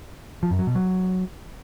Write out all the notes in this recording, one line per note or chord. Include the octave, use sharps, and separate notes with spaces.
F3
F#2
F#3
B2
F#3